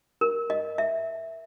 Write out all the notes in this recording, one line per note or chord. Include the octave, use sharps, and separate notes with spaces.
A#4
D#5
E5